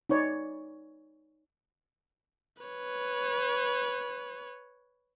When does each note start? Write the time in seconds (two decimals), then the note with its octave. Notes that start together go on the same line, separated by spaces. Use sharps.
0.09 D#4 B4 C#5 D5
2.63 B4 C#5